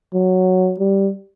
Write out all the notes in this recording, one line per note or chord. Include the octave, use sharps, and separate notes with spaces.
F#3
G3